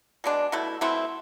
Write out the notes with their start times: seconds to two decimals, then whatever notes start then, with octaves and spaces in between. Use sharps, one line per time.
0.24 B2 G#3 D4
0.52 B2 A3 E4
0.81 B2 A3 C4 E4